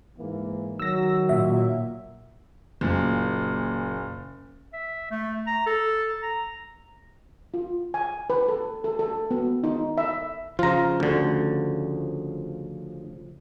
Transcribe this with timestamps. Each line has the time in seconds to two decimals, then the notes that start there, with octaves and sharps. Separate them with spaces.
0.19 G#2 E3 A#3
0.79 D#3 F#3 E6 A#6
1.29 A#2 E5
2.81 F#1 A#2
4.73 E5
5.11 A3
5.47 A#5
5.67 A4
6.22 A#5
7.54 F4
7.94 G#5
8.30 B4
8.48 A4
8.84 A4
8.99 A4
9.31 B3
9.64 D#4
9.98 E5
10.59 C#3 F3 F4 A#5
11.00 D2 D3